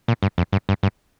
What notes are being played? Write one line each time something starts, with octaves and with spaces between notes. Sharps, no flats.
A#2
G2
F2
G2
G2
G2